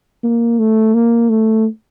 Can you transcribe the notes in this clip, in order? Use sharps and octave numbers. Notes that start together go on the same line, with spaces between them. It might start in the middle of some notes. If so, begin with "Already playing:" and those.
A#3
A3
A#3
A3